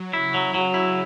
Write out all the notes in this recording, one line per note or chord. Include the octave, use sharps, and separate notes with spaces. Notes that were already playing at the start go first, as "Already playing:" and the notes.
Already playing: F#3
C#3 E4
F#3
F#3
E4